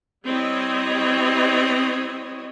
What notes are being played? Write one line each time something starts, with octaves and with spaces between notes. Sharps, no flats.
G3 C4 E4 C#5 D#5